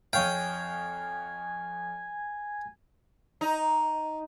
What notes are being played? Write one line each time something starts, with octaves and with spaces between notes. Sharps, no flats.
F2 C#5 F5 G5 G#5
D#4